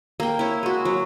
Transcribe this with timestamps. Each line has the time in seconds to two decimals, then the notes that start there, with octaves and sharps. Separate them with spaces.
0.20 A#3 G5
0.39 E4 C#5
0.63 G#3 F#4
0.85 F#3